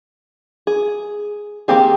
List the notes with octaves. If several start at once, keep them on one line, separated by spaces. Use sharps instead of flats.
G#4
D#3 A#3 C4 G4 G#4